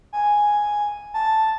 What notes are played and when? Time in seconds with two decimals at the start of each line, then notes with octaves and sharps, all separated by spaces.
0.13 G#5
1.14 A5